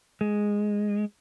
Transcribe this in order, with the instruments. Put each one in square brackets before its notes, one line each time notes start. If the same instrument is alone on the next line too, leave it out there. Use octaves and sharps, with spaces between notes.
[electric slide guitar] G#3